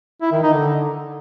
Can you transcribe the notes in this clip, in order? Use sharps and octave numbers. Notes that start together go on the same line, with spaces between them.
E4
D#3
D#4
D3